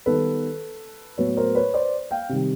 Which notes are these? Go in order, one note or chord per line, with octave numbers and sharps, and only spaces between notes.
D#3 G3 B3 A4 B4
A2 F#3 B3 B4 C#5
A#4 C5
B4 C#5
C5 D5
F5 G5
C3 D#3 G3